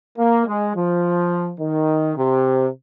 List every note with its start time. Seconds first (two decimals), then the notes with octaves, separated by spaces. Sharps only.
0.18 A#3
0.46 G#3
0.75 F3
1.61 D#3
2.17 C3